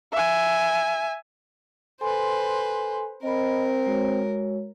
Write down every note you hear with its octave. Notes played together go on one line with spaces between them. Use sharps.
E5 G#5
A4 B4 C5 G#5 C6
C4 A#4 D#5 B5
G#3 F#4 C#5